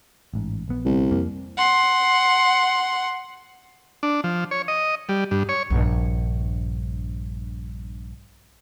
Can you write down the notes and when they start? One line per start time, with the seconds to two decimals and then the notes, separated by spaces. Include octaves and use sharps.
0.34 A1 G#2
0.68 A#1 B3
0.85 C2
1.11 F2 A#3
1.57 F#5 C6
4.03 D4
4.24 F3
4.51 C#5
4.68 D#5
5.09 G3
5.31 G2
5.49 C#5
5.70 A#1 G2